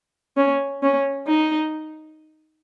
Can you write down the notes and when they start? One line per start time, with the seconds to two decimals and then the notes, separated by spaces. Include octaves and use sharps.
0.37 C#4
0.83 C#4
1.28 D#4